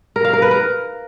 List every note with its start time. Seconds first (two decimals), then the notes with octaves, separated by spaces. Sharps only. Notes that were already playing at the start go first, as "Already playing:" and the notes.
0.16 A#4
0.25 F5
0.33 A#4
0.42 B4
0.51 A#4